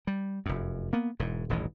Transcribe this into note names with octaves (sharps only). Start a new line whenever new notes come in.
G3
F1 F#2
A#3 B3
E1 G#2
D#1 A1 G#2 E3